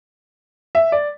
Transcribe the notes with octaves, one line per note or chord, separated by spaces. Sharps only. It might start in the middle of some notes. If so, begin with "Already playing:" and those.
E5
D5